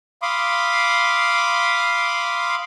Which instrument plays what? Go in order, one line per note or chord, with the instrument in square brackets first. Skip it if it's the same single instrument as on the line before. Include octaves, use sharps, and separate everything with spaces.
[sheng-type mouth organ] F5 B5 C6 D6 D#6